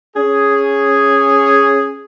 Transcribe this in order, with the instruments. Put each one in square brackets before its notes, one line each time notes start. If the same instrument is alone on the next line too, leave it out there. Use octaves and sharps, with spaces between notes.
[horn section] C#4 G#4